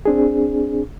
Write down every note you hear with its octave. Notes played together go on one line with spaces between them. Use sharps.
C4 D4 G#4